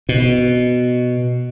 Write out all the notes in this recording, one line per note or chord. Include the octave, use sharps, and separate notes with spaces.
B2